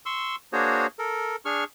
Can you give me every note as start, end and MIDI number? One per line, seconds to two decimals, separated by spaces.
0.06 0.36 84
0.06 0.36 85
0.06 0.36 88
0.53 0.87 58
0.53 0.87 62
0.53 0.87 66
0.53 0.87 68
0.53 0.87 72
0.53 0.87 73
0.99 1.36 69
0.99 1.36 70
1.45 1.64 62
1.45 1.64 68
1.45 1.64 85
1.45 1.64 89